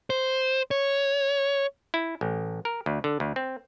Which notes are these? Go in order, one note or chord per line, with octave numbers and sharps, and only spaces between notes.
C5
C#5
E4
A1
A#4
D2
D3
D2
C4